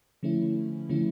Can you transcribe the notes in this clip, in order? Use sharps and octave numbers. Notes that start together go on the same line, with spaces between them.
D3 F3 A3 C#4 E4
D3 F3 A3 C#4 E4